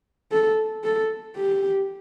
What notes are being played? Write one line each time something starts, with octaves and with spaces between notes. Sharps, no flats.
A4
A4
G4